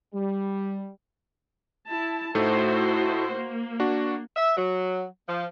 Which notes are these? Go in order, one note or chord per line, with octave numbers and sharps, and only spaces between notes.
G3
E4 A5
A2 A3 D#4 E4 F#4 C5
A#3
D4 F#4
E5
F#3
F3